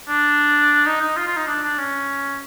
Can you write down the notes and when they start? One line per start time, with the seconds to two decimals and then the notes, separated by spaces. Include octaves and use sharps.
0.09 D4
0.86 D#4
1.01 D#4
1.17 F4
1.27 F4
1.37 D#4
1.47 D4
1.63 D4
1.78 C#4